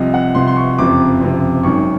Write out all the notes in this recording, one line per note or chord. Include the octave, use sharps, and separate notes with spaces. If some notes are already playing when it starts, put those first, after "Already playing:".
Already playing: C2 C3 F3 D#5
F#5
C2 C3 F3 C6
C6
C#6
F#1 F2 C3 F3 D6
F#1 F2 C3 F3
G#1 F#2 D#3 C#6